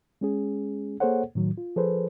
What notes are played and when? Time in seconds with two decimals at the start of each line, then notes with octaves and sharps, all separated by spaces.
0.21 G#3 C#4 G#4
1.00 A#3 G#4 A4 C5 C#5 F#5
1.35 A2 D#3 F#3
1.58 F4
1.76 F3 G#4 A4 B4 C5